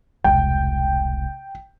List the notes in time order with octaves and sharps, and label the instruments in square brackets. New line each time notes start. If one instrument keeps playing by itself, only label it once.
[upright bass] E1 C2 [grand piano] G5